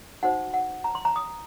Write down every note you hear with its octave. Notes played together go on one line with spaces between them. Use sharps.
D#4 F#4 C5 F#5
F#5
A#5
C6
A#5
D#6